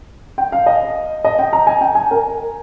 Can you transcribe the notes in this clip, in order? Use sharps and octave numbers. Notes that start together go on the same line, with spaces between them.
G5
F5
D#5
D#5
G5
A#5
G#5
G5
G#5
A#4